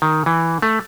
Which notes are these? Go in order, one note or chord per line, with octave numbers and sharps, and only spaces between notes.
D#3
E3
A3